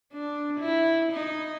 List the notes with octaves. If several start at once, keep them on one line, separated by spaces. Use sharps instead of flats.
D4
E4
D#4